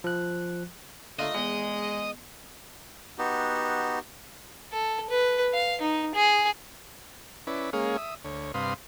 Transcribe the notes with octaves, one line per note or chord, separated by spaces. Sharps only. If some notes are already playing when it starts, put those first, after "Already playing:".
F3 F#6
D3 A3 A#3 F4 D#5
E2 G#3
B3 D#4 F#4 G4
A4
B4
F5
D#4
G#4
C#4 E4 B4 D5
G#3 A#3 C#4 G#4 C#5 F5
E5 D#6
D2 C#5
G2 C3 B4 F5 C6 D#6